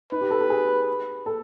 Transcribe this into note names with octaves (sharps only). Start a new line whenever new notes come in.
D#4 B4
G4
A4
A4
G#4
A4